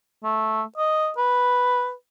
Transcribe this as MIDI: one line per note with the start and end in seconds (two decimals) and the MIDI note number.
0.24 0.62 57
0.78 1.10 75
1.17 1.93 71